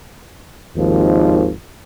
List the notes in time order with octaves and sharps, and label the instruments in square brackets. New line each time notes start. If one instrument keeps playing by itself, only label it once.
[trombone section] G#1 D#2 F3